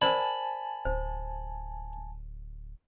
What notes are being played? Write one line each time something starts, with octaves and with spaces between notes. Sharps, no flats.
A#4 C5 D5 G#5 A5 B5
D1 C5